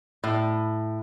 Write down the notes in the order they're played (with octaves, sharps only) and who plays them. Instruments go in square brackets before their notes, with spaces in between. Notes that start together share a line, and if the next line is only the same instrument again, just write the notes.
[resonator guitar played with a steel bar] A2